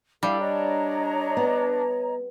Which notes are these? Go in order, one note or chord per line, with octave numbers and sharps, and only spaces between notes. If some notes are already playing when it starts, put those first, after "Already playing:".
G3 D4 E4 A4 F5
C#5 D#5 A#5
B3